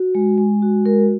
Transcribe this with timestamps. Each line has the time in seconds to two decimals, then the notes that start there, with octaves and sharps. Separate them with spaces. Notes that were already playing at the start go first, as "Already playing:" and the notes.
Already playing: F#4
0.15 G#3
0.38 G#3
0.62 F#4
0.86 G#3 A#4